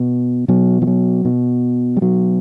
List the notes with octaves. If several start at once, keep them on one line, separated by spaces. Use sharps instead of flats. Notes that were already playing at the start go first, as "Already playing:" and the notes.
Already playing: B2
B2 F#3
F3
F#3
B2
G3
B2 F#3